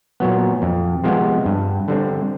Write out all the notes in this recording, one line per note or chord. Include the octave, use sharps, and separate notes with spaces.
A#2 F#3 B3
F2
C3 F3 G#3 B3
G2
D3 G3 C4